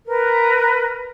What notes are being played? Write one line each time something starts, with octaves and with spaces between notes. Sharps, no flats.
A#4 B4